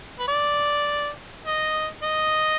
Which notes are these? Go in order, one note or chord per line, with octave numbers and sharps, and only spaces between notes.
B4
D5
D#5
D#5